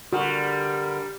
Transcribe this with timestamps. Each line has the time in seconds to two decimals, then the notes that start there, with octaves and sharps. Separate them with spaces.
0.13 D3 G3 F#4 A#4